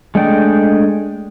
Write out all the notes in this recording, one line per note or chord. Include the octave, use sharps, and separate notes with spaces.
G#3 A3 D4 D#5 G5